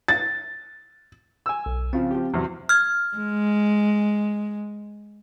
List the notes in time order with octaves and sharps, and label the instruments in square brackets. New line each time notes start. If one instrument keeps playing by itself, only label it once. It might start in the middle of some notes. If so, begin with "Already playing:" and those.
[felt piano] A6
[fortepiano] G#5 E6
[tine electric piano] B1
[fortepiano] C#3 F3 [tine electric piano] C4
[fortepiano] F3 G4
E2 C3 F#3
[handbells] F6 G#6
[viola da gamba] G#3